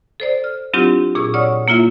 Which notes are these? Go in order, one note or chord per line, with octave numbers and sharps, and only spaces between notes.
A4 C5 D5
F6
F#3 C4 D4 E4 F4 G4
A#2 G#4 C#6 E6
C#5 D5 F#5 C#6 D#6 F6
A#3 E4 F4 E5